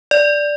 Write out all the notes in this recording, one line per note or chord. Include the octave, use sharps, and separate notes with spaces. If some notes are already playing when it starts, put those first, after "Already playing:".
D5